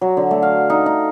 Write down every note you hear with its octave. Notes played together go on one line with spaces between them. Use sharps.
F#3
D3
A3
F5
D#4
D#4